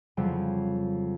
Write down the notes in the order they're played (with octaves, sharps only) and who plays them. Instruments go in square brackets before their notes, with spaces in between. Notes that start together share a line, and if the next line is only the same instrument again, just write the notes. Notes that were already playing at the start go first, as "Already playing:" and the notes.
[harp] F2 C#3 F#3 G3